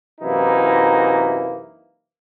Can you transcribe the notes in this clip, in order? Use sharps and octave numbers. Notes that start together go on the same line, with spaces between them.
F#2 C3 E3 A#3 D#4 E4